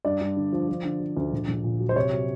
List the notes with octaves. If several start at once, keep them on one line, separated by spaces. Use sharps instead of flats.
G2 D5
G2
D3
F3
F3
D3
F3
D2
A#1
A#1
A#2
F#3
C5
C3 C#5
F#3